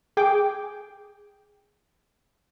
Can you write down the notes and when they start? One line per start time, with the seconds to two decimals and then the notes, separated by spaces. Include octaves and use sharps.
0.17 G#4 G5 D6